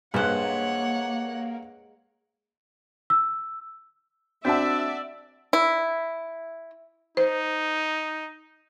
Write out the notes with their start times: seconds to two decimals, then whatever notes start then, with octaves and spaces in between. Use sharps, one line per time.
0.14 G2 G#3 A#3 C5 C#5 F#5 F#6
3.10 E6
4.45 C4 D4 F#4 D5 E5 F#5 A5
5.53 E4
7.17 D#4 C5